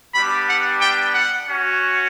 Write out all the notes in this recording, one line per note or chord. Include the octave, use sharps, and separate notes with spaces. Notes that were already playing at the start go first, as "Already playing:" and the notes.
G3 B3 D4 G4 B5
F#5
G5
F#5
C#4 F#4